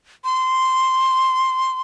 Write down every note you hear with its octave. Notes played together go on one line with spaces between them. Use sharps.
C6